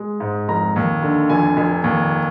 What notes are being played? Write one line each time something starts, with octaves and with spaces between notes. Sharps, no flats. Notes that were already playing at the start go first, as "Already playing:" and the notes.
Already playing: G#3
G#2
F1 A#5
D#2
D3
F1 G#5
F1
D#2